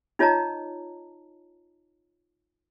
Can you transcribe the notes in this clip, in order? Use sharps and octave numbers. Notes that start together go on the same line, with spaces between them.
D#4 F4 C#5 D#5 A5 A#5